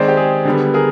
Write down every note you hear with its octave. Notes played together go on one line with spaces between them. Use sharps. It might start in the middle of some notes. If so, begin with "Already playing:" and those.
Already playing: D#3 G#3 C4 C5 D5
G4
G#4
D3 G3 B3
G#4 A#4